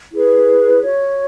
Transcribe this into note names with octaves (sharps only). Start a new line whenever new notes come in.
E4 G#4 B4
F#4 C#5